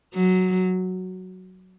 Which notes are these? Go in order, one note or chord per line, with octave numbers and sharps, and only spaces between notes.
F#3